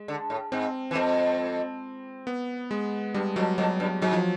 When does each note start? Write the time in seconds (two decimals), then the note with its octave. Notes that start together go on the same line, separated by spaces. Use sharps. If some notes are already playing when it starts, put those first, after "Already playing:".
Already playing: G#3
0.08 D3
0.30 A2
0.52 G#2 C4
0.91 E3
0.95 F2 C4
2.27 B3
2.71 G#3
3.14 G2 G3
3.36 F2 F#3
3.58 F2 F#3
3.80 G2
4.02 G#2 F#3
4.13 F3